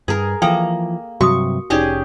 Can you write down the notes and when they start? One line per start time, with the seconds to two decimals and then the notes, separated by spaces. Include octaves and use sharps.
0.08 G2 G#4 A#4
0.42 E3 F3 A#3 A4 G5 A#5
1.21 G2 C3 F#3 F#4 C#6 D#6
1.70 F1 C#4 D#4 G4 G#4 D5